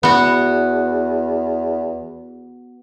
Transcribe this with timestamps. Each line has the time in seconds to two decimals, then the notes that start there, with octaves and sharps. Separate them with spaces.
0.03 E2 B3 F#4